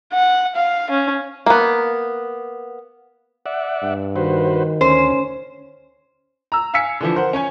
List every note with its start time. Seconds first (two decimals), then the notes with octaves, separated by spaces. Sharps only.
0.13 F#5
0.56 F5
0.91 C#4
1.46 A#3 B3
3.46 D5 E5 F#5
3.83 G2
4.16 D#3 F#4 B4 C5
4.81 D2 C#4 C5
6.52 A#5 E6
6.74 F5 G#5 E6 B6 C#7
7.00 D3 E3 F3
7.15 A#4 C5 F#5
7.33 C#4 C#5 G#5